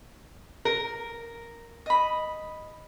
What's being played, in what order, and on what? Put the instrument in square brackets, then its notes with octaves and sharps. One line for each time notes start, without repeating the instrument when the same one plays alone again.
[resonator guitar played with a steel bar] A#4
[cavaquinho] D#5 B5